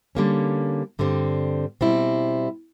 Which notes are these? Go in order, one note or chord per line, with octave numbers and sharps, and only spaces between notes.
D3 G3 A#3 C#4
G2 D3 G3 C4
B2 G3 C4 E4